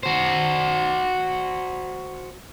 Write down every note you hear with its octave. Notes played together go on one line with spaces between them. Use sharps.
F#4 C5